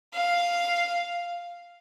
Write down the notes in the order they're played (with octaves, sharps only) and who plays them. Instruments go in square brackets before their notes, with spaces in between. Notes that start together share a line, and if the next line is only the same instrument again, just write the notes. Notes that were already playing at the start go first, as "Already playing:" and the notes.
[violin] F5